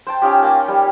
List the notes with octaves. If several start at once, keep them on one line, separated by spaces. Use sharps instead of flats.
C5 G5 A5
C#4 D#4 F4 G4
A#3
G3